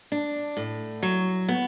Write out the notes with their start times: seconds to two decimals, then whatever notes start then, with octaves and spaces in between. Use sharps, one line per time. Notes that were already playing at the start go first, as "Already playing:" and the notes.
0.12 D4
0.57 A2
1.03 F#3
1.48 B3